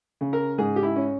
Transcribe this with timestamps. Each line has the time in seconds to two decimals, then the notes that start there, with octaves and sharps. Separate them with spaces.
0.21 C#3
0.33 A#4
0.58 G#2 G#4
0.76 G4
0.83 E4
0.96 C#4